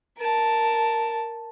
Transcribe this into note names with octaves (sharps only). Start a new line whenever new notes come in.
A#4 A5